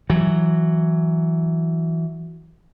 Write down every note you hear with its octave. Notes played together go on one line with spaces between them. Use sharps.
E3 F#3